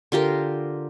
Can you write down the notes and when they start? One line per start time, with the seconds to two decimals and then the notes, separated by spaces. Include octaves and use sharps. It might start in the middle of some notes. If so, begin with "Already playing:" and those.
0.12 D3 F4 G4 A#4